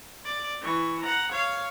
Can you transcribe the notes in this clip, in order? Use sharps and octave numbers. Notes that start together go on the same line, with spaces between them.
D5
E3 C#6
F#5 A#5
C#5 F5